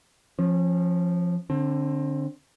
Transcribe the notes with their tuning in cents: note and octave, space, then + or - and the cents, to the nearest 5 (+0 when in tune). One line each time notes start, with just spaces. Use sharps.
F3 +0 C#4 -35
D3 +0 C4 +30